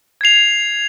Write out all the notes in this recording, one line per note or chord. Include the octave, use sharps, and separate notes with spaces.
G#6 C7 F7